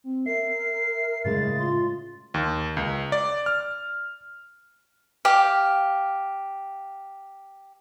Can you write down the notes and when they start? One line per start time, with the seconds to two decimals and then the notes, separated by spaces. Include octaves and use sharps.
0.04 C4
0.26 A#4 E5 C7
1.25 A2 C#3 G#3 A6
1.59 F4 C6
2.34 D#2
2.77 C#2
3.12 D5
3.46 F6
5.25 G4 F5